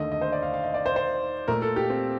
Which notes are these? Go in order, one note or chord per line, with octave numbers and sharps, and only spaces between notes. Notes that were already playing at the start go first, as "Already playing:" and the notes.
Already playing: D#2 D3 A3 D#5
D#5
C5
D5
F5
F5
D#5
D5
C5
C5
A#2 A3 A#4
A4
G4
C4